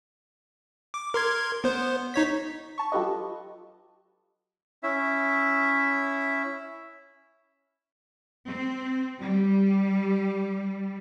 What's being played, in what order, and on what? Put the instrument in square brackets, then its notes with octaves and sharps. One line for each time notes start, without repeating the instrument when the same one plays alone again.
[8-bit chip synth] D6
A#4 C6 G#6
B3 C5
D#4 C#5 B6
[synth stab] A5 C#6
F#3 F4 G4 A4 B4 D#5
[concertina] C#4 E4 E5
[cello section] C4
G3